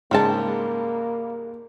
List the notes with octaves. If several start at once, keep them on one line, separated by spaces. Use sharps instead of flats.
G#2 C#3 G3 G#3 A#3 C5 A5